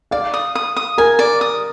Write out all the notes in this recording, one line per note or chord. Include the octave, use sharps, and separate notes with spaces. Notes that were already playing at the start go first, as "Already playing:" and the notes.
D5 F5
D#6
D#6
D#6
A#4 G#5
D5
D#6